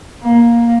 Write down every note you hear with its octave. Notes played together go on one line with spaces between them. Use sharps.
A#3